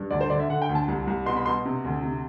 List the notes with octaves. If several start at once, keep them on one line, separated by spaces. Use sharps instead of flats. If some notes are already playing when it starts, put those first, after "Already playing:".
Already playing: G2
D2 D5
C5
D3 D5
E5
D3 F#5
G5
D2
A5
C2
C2
B2 C6
B5
B2 C6
C3
D2
C3